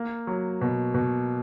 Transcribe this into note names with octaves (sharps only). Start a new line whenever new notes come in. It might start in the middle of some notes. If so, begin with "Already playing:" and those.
Already playing: A#3
F#3
B2
B2